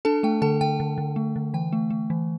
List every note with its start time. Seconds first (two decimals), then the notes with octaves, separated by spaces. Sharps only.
0.05 D4 A4 A5
0.23 A3 G5
0.42 D3 A4 A5
0.61 D3 G5
0.80 D3
0.98 D3
1.16 A3
1.36 D3
1.54 E3 G5
1.73 A3
1.90 A3
2.10 E3